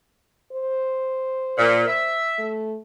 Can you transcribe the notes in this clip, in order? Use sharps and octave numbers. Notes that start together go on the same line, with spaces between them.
C5
A#2
E5
A3